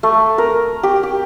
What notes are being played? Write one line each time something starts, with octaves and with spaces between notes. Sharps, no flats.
A3
A#4
G4
G4